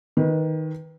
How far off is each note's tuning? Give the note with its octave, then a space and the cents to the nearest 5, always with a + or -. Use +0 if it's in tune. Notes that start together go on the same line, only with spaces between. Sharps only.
D#3 +15 B4 +0